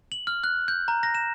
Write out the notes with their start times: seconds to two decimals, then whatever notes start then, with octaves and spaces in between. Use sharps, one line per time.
0.12 F#7
0.27 F6
0.44 F#6
0.68 G6
0.88 A#5
1.03 A#6
1.15 E7